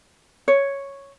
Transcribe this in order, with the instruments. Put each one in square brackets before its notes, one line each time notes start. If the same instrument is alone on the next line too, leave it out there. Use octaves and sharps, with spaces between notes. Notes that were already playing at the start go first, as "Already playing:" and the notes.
[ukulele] C#5